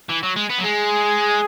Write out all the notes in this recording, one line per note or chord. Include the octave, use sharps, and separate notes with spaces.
E3
F#3
G#3
B3
F#3
G#3 G#4